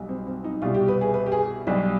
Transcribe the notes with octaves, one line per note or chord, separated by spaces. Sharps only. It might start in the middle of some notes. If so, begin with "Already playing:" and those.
Already playing: B1 B2 G3
C4
C4
D#4
C2 B2 G3 F4
G4
B4
G#4
B4
G4
G#4
B1 B2 G3 G4